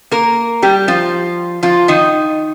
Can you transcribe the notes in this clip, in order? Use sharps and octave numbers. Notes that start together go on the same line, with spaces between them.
A#3 A#4
G3 G4
F3 F4
F3 F4
D#3 D#4